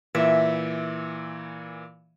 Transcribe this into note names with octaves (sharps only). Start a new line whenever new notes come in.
A#2 E3 E5